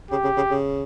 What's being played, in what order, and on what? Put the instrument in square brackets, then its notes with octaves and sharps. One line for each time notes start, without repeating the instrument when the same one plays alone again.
[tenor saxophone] C#3 [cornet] G4
[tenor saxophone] C#3
C#3
C#3